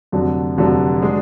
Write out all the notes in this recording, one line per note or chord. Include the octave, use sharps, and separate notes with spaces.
F1 F2 D3 F#3
F1 F2 D3 F#3
G#3 D4